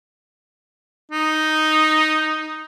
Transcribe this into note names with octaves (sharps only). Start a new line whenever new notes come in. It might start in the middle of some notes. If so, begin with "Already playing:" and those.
D#4